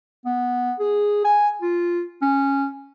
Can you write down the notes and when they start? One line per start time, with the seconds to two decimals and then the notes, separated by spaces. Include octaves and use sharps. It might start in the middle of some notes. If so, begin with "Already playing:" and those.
0.26 B3
0.79 G#4
1.25 G#5
1.62 F4
2.22 C#4